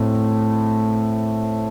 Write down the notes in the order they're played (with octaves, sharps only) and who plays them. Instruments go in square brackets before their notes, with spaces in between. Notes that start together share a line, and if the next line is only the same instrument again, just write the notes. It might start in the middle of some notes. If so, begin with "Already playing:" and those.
Already playing: [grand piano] A2 A3 C4